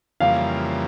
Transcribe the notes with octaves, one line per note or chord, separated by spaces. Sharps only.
F2 C#3 E3 G3 A#3 F5